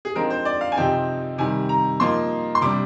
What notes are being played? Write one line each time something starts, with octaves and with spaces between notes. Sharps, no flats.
G#4
D3 F3 G#3 C4 D#4 A#4
C5
D5
F5
G#5
C3 F3 C4 D#4 G5
C3 D#3 G3 G#5
A#5
F3 A#3 D#4 C6
C6
C3 G3 D4 D6